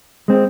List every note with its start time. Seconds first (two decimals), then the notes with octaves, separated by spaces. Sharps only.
0.28 G#3 C4